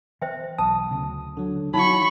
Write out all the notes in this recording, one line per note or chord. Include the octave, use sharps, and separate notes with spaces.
E3 C5 E5 G5
B1 A5 D#6
D2 C#3
D3 F#3
E3 F#3 D#4 E4 F#4 C#5 B5 C#6